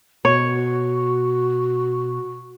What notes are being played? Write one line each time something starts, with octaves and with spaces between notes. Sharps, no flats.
B2 F#4 C#5